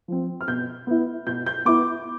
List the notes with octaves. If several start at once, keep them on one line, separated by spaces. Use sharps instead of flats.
F3 C4
F6
B2 G6
B3 E4
B2 G6
G6
B3 E4 D6